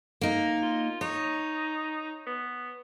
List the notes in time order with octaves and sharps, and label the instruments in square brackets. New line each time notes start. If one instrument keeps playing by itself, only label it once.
[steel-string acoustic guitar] A#3 D#4
[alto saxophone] F4
[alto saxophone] D#4 [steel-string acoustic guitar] C#5
[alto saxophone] B3